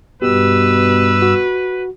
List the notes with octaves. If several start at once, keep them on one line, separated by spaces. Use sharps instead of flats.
G2 B2 G4 B4 E6
F#4